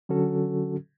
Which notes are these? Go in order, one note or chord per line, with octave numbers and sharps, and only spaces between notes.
D3 F#3 C#4 F#4 A4